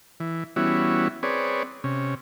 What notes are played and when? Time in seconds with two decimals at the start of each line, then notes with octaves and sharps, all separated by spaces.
0.20 E3
0.56 E3 G3 B3 C#4 E4 F#4
1.23 C4 G#4 B4 C#5 D5
1.84 C3 C#4